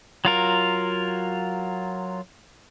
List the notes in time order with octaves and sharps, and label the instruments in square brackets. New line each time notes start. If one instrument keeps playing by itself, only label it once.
[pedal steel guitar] F#3 F4 A#4